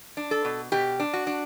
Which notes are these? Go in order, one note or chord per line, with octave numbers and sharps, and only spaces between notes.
D4
A4
B2
B2 G4
D4
F#4
D4